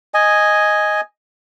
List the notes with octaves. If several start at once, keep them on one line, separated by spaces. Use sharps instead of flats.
D#5 G#5